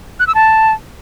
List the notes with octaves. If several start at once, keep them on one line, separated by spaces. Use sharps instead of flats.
F#6
E6
A5